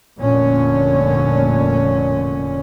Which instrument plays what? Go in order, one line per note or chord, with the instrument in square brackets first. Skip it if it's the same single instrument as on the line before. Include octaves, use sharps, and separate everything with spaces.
[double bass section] F1 A#2 D3 C#4